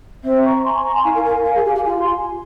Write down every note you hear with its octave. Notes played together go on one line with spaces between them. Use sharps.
C4 C5 E5
A#5 C#6
G#5 C6
C#6
G#5 C6
A#5 C#6
G#5 C6
E4 F5 G#5
A#4
A#4
A#4
G#4
G4
G4
F4 F5 G#5
G#5 C6